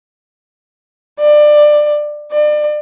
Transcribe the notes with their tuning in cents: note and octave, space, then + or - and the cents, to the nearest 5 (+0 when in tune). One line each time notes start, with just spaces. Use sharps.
D5 +20
D5 +35